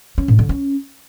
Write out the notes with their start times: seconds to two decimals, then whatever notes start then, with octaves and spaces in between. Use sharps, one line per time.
0.18 C#4
0.28 A2
0.39 D3
0.49 C#4